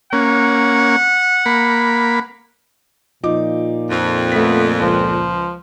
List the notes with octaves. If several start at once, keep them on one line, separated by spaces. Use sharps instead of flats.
A#3 C#4 F#5
A#3 B5
A#2 F3 D#4 D6
F2
A3 B3 B6
C#2 F3